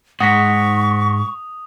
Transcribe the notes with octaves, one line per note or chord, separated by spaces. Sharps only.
G#2 F#5 C#6 D#6 A#6 B6